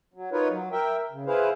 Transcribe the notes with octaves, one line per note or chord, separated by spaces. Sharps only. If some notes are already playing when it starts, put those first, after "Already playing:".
F#3
D#4 F4 A#4 B4 C#5
F#3
A#4 E5 G5
C#3
E4 G#4 B4 C5 F5